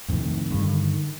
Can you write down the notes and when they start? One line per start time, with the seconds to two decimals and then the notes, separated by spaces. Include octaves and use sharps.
0.08 F2 A2 C3 D#3
0.50 G2 D3 D#3